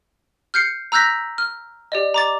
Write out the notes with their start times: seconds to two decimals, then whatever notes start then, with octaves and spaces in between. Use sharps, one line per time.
0.54 F6 G6 C7 C#7
0.92 A#5 E6 F#6 G6 A#6 B6
1.38 F6
1.92 G4 D5 D#5
2.14 A#5 D6 A6